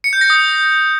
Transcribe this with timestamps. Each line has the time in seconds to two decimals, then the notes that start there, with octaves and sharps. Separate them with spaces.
0.04 C#7
0.13 G6
0.21 A#6
0.30 D#6